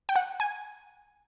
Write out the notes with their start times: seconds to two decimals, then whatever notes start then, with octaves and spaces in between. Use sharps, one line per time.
0.09 G5
0.16 F#5
0.40 G#5